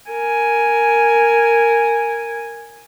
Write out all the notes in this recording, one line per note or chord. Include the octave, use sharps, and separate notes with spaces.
A#4 G#5